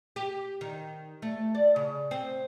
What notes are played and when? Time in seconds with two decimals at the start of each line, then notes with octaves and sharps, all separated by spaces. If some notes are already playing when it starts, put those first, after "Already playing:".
0.16 G4
0.61 D#3
1.22 A3
1.55 D5
1.76 C#3
2.11 C4